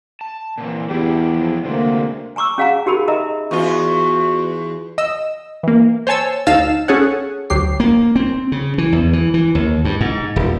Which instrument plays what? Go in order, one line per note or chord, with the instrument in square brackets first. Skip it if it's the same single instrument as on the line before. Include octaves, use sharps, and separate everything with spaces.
[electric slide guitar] A5
[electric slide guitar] A#2 B3 C4 [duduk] E3
[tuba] E2 [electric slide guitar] G3 D4 E4 [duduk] G4
[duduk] F3
[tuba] D2 [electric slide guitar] C3 G#3 C4 [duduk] A#3
[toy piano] G#5 A#5 C#6 D6 E6
C#4 G#4 F5 F#5 G#5 A#5
D#4 G4 G#4 A#4 B5
A4 A#4 D#5 E5 A#5
[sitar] E2 F4 [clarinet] F#4
[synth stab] D#5 E6
E3 A#3
C5 C#5 G#5 A5 E6
D2 D#4 F5 A5 E6 E7
C#4 G#4 A4 C#5 F#5
D2 F#3 G4 C7
[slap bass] A#3
C4
C#3
E3
E2
E3
E3
D#2
G2
G#2
D#1